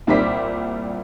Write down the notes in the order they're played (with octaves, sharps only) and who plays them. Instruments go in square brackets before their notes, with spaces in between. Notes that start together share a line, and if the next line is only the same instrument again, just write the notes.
[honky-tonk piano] C2 A#2 G3 C5 D6 B6